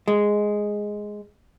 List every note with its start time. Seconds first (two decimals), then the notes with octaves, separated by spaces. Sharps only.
0.08 G#3